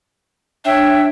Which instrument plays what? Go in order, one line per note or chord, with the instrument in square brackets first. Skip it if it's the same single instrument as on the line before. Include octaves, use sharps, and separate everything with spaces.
[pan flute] D4 [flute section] C#5 E5 G5